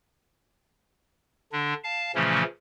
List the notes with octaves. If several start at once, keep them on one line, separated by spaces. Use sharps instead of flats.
D3 D4
F5 A5
A#2 C#3 E3 F3 A3 C#4